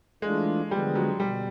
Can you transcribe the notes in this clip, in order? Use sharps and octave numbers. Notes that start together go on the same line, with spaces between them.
E3 G#3 A3 D4 F4
D3 F3 G3 G#3 B3
F#3
B2 G3